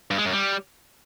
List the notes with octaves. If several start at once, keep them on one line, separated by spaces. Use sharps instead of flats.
G2
G#3
F#2
G3